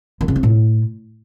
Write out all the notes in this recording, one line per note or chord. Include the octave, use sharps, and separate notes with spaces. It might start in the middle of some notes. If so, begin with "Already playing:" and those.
D#3
C#3
C4
A2